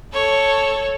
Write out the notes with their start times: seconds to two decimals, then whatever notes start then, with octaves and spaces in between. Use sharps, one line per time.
0.13 A4 C#5